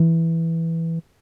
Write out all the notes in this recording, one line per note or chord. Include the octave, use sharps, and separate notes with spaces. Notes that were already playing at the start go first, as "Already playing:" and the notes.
Already playing: E3